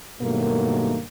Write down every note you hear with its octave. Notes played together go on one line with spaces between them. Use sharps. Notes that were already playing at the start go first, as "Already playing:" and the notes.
G2 B2 D#3 F#3 A3 A#3